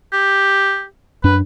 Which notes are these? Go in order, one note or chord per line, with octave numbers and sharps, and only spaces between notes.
G4
F#2 D4 B4